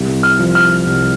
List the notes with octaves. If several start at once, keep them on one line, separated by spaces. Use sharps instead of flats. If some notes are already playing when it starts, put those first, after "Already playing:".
Already playing: C2
F6
F3
F6
C2